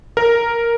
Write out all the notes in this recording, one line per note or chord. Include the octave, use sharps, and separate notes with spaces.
A#4